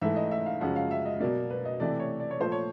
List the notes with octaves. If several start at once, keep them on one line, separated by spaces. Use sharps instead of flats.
G#2 E3 A3 E5
D#5
E5
F5
F#2 C#3 F3 G#3 F#5
F5
E5
D#5
B2 F#3 A#3 D5
B4
D#5
C3 E3 A3 D5
C#5
D5
C#5
A#2 F3 A3 C5
C#5